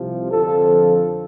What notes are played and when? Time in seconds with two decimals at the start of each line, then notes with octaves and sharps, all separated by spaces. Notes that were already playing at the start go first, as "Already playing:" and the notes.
Already playing: C2 C3 F3
0.31 F2 D3 F3 A4